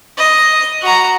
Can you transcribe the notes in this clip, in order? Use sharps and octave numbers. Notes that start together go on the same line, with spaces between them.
D#5
F#4 A#5